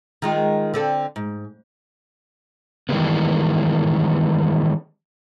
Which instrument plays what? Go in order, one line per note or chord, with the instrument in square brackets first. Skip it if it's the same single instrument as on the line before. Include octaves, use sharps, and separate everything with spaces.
[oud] D#3 G#3 F4
D3 C4 A4
G#2
[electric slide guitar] D#3 E3 G3 G#3 A#3 B3